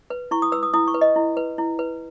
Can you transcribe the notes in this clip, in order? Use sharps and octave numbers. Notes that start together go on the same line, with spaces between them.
B4
E4 C#6
D#6
B4 E6
D#6
E4 D#6
C#6
B4
D#5
E4
B4
E4
B4